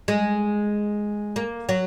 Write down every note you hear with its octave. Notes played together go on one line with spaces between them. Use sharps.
G#3
A#3
F#3